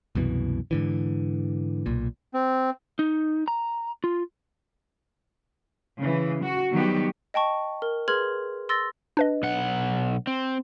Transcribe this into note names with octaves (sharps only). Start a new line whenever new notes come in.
C2 F#2 B2 E3
G#2 D3 E3
B1 A#2
C4
D#4
A#5
F4
C#3 E3
F#4
D#3 F#3 G3 B3 F#4 G4
D#5 G5 A5 C#6
A#4
G#4 B4 C6 F6 G#6 F#7
C6 E6 A6 A#6
D4 B4 D#5
B1 F#5
C4